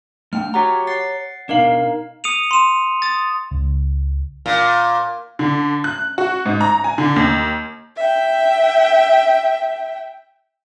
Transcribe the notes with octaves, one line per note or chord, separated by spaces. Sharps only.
A3 D4 G5 F6
F#4 G4 C#5 F#5 A#5
F#5 A6 C7
B2 D4 D#4 A#4 F5
D#6 C#7 D#7 F7
C6 E7
D#6 A6
C#2
A#2
D3
F#6
F#4
G#2
A#5
G#5
D3
D#2
E5 G5